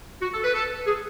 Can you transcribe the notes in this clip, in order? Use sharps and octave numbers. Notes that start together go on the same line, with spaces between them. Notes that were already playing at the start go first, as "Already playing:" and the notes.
F#4
A4
B4
A4
G#4